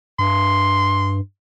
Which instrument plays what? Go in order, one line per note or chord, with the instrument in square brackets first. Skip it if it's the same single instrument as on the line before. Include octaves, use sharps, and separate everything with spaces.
[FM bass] G2 [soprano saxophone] C6